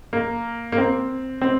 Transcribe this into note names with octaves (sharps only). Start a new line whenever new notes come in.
A#3
A#3
C4
C4